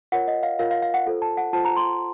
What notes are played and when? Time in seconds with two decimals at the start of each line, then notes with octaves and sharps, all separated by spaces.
0.12 F4 A#4 C#5 F#5
0.28 D#5
0.43 F5
0.59 F4 A#4 C#5 F5
0.71 F5
0.82 F5
0.94 F#5
1.06 F4 A4 C5
1.22 A5
1.37 F#5
1.53 F4 A4 C5 A5
1.65 A#5
1.76 C6